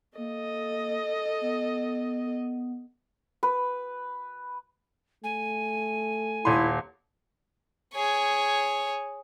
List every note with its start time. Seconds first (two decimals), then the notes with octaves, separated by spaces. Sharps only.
0.17 A#3 A4 D#5
1.41 B3
3.43 B4
5.24 A3 G#5
6.45 D#1 E4 C6
7.94 G#4 C#5